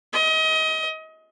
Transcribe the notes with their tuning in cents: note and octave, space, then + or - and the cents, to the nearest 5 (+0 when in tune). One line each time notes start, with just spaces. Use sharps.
D#5 +30